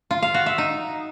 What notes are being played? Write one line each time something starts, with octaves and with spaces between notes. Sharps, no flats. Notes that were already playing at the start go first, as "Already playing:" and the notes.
F4
F5
F#4
E5
D#4